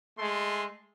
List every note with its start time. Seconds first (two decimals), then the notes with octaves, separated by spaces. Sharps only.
0.18 G#3 A3 C6